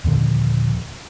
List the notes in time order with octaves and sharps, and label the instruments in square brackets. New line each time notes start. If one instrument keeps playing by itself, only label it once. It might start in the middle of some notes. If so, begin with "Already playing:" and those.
[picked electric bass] D#2 A#2 D3 F3